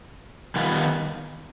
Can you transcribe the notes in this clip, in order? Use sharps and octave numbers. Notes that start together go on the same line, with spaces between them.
D#3 G3 B3 F4 B4